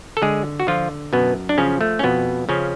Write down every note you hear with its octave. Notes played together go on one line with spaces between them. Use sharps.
A4
D3 G#3 G#4
F#4
D3 F3 F4
F#2 B2 B3
D4
C#3 F3 C#4
A3
C#4
F2 B2 B3
C#3 F3 C#4